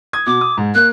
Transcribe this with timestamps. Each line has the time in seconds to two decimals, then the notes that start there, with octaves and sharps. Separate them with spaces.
0.13 D#6 G#6
0.26 B2 D6
0.41 D#6
0.57 G#2
0.75 A#3 F#6